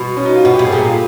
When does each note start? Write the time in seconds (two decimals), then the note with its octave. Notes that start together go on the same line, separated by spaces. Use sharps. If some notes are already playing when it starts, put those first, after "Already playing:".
Already playing: B2
0.16 C#4
0.25 D#4
0.36 F4
0.44 B2 F#4
0.54 G4
0.59 B2
0.64 A2 G#4
0.72 A#2 G4
0.87 F4